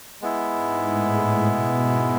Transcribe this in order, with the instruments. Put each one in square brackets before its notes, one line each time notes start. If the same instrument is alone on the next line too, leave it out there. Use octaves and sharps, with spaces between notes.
[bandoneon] G#3 B3 E4
[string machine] G#2
A2
B2
G#2